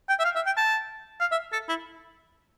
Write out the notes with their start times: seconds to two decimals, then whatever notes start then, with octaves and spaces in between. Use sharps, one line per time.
0.09 G5
0.20 E5
0.25 F5
0.36 E5
0.46 G5
0.57 A5
1.20 F5
1.32 E5
1.53 A4
1.69 E4